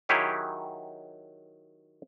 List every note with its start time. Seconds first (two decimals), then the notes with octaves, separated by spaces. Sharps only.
0.09 D#3 F#3 E4 G4 G#4 C#5